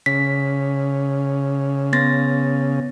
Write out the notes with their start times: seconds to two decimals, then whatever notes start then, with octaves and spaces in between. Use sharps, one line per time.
0.06 C#3 B6
1.93 B3 A6 A#6